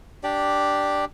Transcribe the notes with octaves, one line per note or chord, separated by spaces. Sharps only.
D4 G4 D5